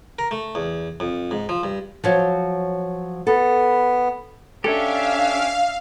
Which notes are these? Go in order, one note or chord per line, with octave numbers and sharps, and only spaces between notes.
A#4
A3
E2
F2
G#2
F3
G2
F3 F#3 C#5
B3 A4
C#4 D4 G4 A4 E5 F5